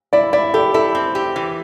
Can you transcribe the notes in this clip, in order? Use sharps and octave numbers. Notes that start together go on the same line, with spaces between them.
E4 D5
E4 D5
G4 A4
E4 A4
C4
G4
E3